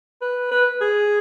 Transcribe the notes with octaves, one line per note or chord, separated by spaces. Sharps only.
B4
B4
G#4